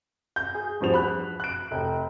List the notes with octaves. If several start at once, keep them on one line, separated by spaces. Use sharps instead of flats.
G6
G#4
E2 G2 F3 F7
B5 F#6
F#6 D7
F1 G5